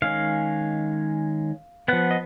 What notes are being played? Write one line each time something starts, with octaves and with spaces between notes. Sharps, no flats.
D#3 G#3 C#4 F5
F3 B3 F#5
D#5